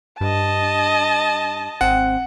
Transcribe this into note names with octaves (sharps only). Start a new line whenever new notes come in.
G2 D#5 A5
G#1 C4 F#5